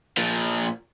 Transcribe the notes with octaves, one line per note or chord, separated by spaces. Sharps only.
A#2 F3